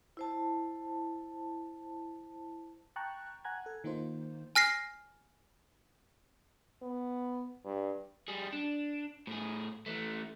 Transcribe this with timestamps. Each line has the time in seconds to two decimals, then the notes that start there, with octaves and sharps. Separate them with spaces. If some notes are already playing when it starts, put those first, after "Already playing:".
0.17 E4 C5 A5
2.96 G5 A5 A#5 C#6 F#6
3.45 F#5 G#5 A#5 F#6 G#6
3.66 A4
3.84 D#3 A#3 D#4 F4 C5
4.56 G#5 F6 A#6 C7
6.82 B3
7.64 G2
8.28 G3 G#4
8.53 D4
9.27 A2 G#4
9.86 E3 A3